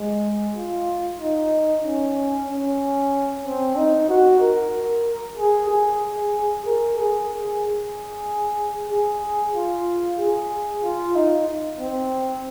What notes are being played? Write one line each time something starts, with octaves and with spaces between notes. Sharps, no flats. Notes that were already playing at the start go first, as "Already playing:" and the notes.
Already playing: G#3
F4
D#4
C#4
C#4
C4
D#4
F#4
A#4
G#4
G#4
G#4
A#4
G#4
G#4
G#4
F4
G#4
F4
D#4
C4